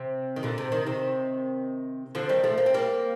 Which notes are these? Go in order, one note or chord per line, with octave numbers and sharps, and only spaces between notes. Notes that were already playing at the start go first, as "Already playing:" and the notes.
Already playing: C3
D#3
A#2 D3
C3
C3 D#3
C3 D#3
D3 F3
D#3 G3
F3 A3
A#3
C4
G3 A#3